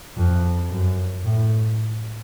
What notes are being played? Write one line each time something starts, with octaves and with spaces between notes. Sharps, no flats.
F2
F#2
A2